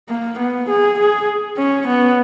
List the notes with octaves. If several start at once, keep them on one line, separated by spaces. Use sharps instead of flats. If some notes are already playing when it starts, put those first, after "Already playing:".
A#3
B3
G#4
G#4
C#4
B3